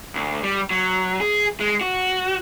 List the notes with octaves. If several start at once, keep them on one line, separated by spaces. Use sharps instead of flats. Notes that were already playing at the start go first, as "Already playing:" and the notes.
D2
G3
F#3
G#4
G#3
F#4